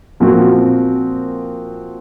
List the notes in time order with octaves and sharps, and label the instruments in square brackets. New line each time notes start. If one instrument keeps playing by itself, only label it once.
[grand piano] A#2 F3 C4 F#4